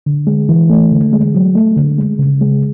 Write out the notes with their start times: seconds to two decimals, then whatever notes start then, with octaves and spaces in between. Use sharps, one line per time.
0.06 D3
0.27 G#3
0.49 E3
0.70 A3
0.91 D3
1.13 G#3
1.35 F#3
1.55 A3
1.77 D3
1.99 G#3
2.19 C#3
2.41 G#3